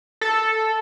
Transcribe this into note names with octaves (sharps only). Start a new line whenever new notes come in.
A4